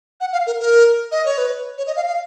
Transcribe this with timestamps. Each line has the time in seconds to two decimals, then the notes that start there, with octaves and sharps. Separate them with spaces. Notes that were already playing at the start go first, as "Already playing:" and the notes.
0.21 F#5
0.33 F5
0.47 A#4
0.60 A#4
1.12 D#5
1.26 C#5
1.38 B4
1.78 C#5
1.87 D#5
1.96 F5
2.07 F5